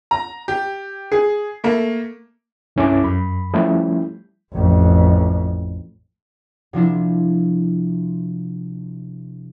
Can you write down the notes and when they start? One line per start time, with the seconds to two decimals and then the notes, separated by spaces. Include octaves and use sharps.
0.11 A#5
0.48 G4
1.12 G#4
1.64 A3 A#3
2.76 C2 G2 C#4 E4 A4 D6
3.04 F#2 B5
3.54 F3 G3 A3 C#4 E4
4.53 A1 F2
6.73 C3 F3 D4 E4